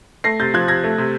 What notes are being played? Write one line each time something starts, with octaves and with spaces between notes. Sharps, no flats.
A3 A#6 C7
C3 G6 A6
F3 F#6 G#6
C3 G#6 A#6
A3
C3